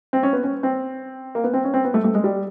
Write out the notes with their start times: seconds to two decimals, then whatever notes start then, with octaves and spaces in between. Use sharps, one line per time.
0.13 C4
0.23 C#4
0.33 B3
0.43 C#4
0.63 C4
1.35 A#3
1.44 B3
1.54 C4
1.64 C#4
1.74 C4
1.84 B3
1.94 A3
2.04 A3
2.15 G#3
2.24 G3